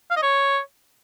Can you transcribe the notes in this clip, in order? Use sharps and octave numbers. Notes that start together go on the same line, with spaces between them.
F5
D#5
C#5